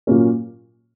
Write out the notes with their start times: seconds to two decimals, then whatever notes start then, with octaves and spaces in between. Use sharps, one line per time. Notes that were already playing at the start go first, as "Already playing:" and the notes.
0.07 A#2 F#3 A#3 C#4